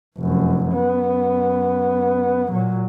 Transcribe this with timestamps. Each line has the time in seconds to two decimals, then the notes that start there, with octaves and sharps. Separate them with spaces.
0.18 F1 F#2
0.70 F#2 B3
2.51 A#2 F#3